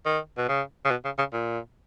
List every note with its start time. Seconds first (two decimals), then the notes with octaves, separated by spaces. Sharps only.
0.06 D#3
0.38 B2
0.49 C#3
0.85 C#3
0.91 B2
1.05 C#3
1.18 C#3
1.33 A#2